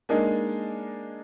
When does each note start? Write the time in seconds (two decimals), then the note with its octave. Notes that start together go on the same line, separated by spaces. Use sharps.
0.09 G#3 A#3 D4 D#4 G#4 A#4